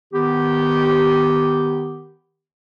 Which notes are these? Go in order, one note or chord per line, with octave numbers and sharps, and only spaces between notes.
D#3 B3 G4